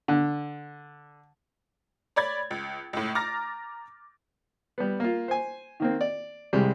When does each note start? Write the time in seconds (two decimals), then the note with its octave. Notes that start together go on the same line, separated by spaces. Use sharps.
0.08 D3
2.16 C#5 D5 B5 G#6 A6
2.51 C#2
2.93 C#2 A2
3.15 A#5 D6 F6 A6 A#6
4.78 G3 B3
5.00 A#3 F4
5.28 C5 G#5
5.80 D#3 A#3 C4
6.01 D5
6.53 C2 C3 G3 G#3